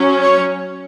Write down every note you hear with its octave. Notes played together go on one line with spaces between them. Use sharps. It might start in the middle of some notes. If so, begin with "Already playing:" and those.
Already playing: F#3 C#4
C#5